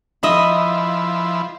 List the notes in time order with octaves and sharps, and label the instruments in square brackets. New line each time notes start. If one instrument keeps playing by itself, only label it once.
[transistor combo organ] F3 E4 [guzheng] D#5 E5 B5